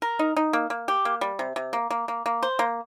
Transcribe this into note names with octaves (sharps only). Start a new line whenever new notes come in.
A#4
D#4
D#4
A#3
A#3
G4
A#3
G3
C3
C3
A#3
A#3
A#3
A#3
C5
A#3